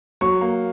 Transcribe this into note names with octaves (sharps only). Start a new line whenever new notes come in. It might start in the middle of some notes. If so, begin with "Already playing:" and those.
F#3 C#6
A#3